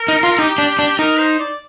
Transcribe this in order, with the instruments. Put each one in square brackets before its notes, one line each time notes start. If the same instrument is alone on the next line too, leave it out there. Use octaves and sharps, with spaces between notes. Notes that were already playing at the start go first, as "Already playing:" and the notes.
Already playing: [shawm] A#4
[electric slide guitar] D#4
F4
[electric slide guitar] D#4 [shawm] G4
[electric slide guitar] D4
D4
[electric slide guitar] D#4 [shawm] A#4
[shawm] C5
D5